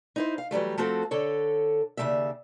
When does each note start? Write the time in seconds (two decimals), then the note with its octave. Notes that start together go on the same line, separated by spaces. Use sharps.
0.16 D#4 E4 C5
0.38 F5
0.51 E3 F#3 G3 A3
0.78 F3 A3 C4 F#4 A4
1.11 D3 A4 C#5
1.97 D#2 C#3 E3 A3 D5 E5